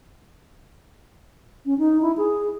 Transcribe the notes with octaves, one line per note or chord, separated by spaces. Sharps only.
C#4
D#4
E4
G#4